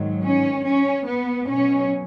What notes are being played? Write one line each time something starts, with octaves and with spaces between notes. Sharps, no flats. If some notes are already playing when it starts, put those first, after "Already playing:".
Already playing: G#2 D#3 F#3
C#4
C#4
B3
B2 F#3 C#4